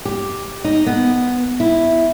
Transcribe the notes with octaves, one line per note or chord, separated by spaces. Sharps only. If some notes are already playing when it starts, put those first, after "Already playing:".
G4
D#4
B3
E4